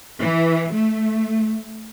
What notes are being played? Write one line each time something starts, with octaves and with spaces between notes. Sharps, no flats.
E3
A3